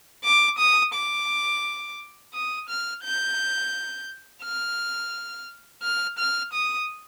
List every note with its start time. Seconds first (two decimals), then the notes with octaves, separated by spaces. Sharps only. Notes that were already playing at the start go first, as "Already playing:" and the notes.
0.25 D6
0.58 D#6
0.94 D6
2.34 D#6
2.69 F6
3.04 G6
4.43 F6
5.83 F6
6.18 F6
6.53 D#6